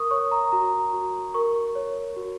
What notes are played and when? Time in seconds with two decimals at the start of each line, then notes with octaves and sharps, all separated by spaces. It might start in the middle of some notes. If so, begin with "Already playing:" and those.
Already playing: A#4 C#6 D#6
0.11 C#5 C#6
0.31 A#5
0.52 F#4 A#5
0.93 F#4
1.34 A#4 C#6
1.75 C#5
2.16 F#4